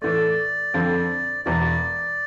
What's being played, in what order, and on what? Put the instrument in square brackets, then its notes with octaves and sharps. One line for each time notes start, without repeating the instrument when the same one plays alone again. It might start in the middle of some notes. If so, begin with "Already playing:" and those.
[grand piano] A2 E3 A3 [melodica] D5
[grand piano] F2 D3 F3 C4
[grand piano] E1 E2 E3 [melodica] D5